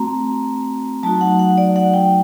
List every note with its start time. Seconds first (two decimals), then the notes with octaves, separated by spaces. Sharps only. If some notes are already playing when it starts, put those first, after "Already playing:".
Already playing: A3 C4 F#4 A#5
1.03 F#3 A3 D#4 F#4 A5
1.21 F#5
1.39 F#5
1.58 D5
1.76 F#5
1.94 G5